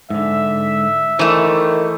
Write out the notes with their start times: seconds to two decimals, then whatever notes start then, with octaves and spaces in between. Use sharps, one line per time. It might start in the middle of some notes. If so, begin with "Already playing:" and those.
0.10 G#2 D3 E5
1.19 D#3 E3 A3 C5 D5 G#5